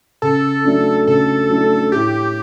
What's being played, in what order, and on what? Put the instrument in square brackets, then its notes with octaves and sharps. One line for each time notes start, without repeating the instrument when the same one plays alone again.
[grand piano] C#3 [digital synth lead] A4
[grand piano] F#3 A3 D4
[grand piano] C#3 [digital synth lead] A4
[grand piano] F#3 A3 D4
[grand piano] A2 [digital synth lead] G4